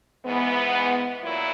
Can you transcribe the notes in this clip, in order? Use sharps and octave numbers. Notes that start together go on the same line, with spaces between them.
G#2 E3 G#3 B3
A#2 F#3 E4